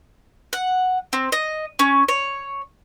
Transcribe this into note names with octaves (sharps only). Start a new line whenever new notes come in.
F#5
C4
D#5
C#4
C#5